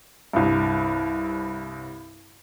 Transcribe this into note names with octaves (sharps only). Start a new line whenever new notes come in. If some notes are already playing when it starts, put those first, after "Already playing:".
C2 G2